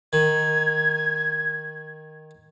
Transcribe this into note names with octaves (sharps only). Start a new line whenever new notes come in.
D#3 G#6